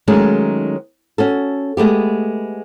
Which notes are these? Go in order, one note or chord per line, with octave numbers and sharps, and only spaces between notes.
D#3 F#3 G#3 A3 C#4 D#4
C#4 F#4 A4
G#3 A3 B3 G4